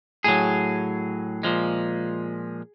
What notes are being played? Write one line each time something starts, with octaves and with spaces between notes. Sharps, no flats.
A2 F#3 G#4
A#2 F3 G#3